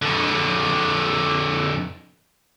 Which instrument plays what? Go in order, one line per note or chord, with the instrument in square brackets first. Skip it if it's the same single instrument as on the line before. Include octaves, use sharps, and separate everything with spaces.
[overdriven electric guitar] F2 D3